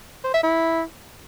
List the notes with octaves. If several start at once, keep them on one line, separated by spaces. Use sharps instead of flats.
C5
E5
E4